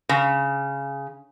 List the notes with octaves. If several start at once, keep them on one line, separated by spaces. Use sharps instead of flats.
C#3